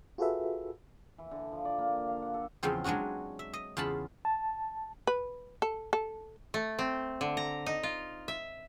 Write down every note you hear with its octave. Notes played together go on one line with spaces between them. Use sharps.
F4 F#4 G#4 A4 B4 E5
E3
D3
F3
D5
A#3
F5
F#5
A4
E2 C#3 F3 C4
F#3 G#3 D4 F4 F#4
E5
D#5
E2 C#3 F4 A5 B5
A5
B4
A4
A4
A3
C4
D3
A#5
D#4
F4
E5